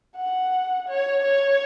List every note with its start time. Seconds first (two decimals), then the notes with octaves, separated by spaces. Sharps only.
0.16 F#5
0.87 C#5
1.22 C#5